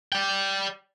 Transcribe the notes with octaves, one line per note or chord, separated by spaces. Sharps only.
D5 G5